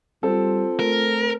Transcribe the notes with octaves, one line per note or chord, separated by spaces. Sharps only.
G3 C4 F4 A4
A3 A#4